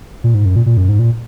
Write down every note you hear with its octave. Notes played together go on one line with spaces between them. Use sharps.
A#2
G#2
F#2
A#2
A#2
F#2
G#2
A#2